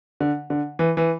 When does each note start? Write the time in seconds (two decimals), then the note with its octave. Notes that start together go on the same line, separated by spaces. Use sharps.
0.20 D3
0.50 D3
0.79 E3
0.97 E3